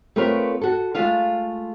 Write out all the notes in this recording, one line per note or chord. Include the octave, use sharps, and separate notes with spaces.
A3 B3 C4 F4 A#4 C#5
F#4 A4
G#3 A3 F4 F5